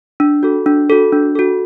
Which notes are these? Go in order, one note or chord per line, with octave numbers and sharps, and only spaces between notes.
D4
F#4 A4
D4
F#4 A4
D4
F#4 A4